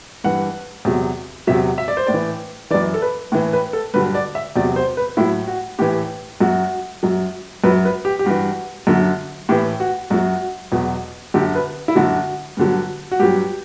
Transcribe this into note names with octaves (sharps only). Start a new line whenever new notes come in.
G2 E3 F#5
E2 C3 F#3
E2 C3 F#3 E5
E5
D5
C5
A2 D5
E3
F#2 E3 D5
A4
B4
A2 E3
B4
A4
G2 D3 F#3 B4
D5
E5
E2 C3 F#3 D5
C5
B4
A2 F#3 E4
F#4
A2 E3 G4
F#2 F#3 F#4
F#2 F#3
F#2 F#3 B4
B4
G4
G4
G2 E3 F#4
F#2 D3 F#3
A2 E3 G4
F#4
F#2 F#3 F#4
E2 B2 F#3
F#2 D3 F#3 G4
B4
E4
F#2 D3 F#3 F#4
G2 D3 F#3
F#4
G2 F#3 G4